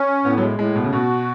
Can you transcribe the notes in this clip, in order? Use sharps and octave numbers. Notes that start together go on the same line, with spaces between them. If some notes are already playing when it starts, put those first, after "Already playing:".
Already playing: C#4
A2 B3
F#3
G#3
A2 G#3
B2
C#3
B2 F#4